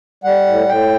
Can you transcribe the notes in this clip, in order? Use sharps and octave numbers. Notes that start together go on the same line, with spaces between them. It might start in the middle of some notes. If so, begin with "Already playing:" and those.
G3 F#5
A2
A2 G5